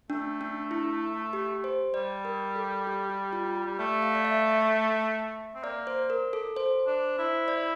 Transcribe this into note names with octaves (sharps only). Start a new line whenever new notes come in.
A3 D4
D4
E4
G4
C5
G3 D5
A#4
A4
G4
G4
F4
G4
G3
A3 D5
F5
D5
E5
E5
C4
A#3 D5
C5
A#4
A4
C5
D4
E4
D5